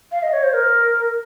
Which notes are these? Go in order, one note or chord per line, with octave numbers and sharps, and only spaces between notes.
F5
D#5
C#5
C5
A#4